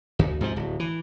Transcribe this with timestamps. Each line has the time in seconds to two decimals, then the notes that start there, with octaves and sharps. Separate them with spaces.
0.19 D2
0.41 G#2 C3 E3 F3
0.56 D1
0.80 E3